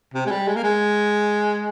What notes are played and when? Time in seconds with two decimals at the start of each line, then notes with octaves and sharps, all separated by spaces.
0.14 C3
0.26 G#3
0.31 G3
0.48 G#3
0.56 A#3
0.63 G#3